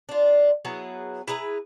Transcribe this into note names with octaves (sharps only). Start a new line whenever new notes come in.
D4 F4
F#3 B3 E4 G#4
E4 G#4 B4 A#5